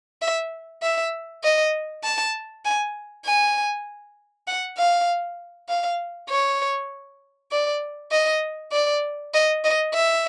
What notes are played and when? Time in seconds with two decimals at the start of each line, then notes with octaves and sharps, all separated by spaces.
0.22 E5
0.83 E5
1.44 D#5
2.04 A5
2.65 G#5
3.25 G#5
4.47 F#5
4.78 F5
5.69 F5
6.29 C#5
7.52 D5
8.12 D#5
8.72 D5
9.34 D#5
9.64 D#5
9.94 E5